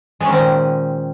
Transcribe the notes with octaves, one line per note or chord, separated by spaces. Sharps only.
A#2 D#3 G#3 C4 C#4